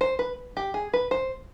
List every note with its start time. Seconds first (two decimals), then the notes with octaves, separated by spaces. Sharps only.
0.01 C5
0.19 B4
0.57 G4
0.74 G#4
0.93 B4
1.11 C5